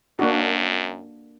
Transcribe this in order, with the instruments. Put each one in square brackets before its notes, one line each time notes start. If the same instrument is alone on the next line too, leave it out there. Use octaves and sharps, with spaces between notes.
[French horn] F#2 [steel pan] A#3 D4 F#4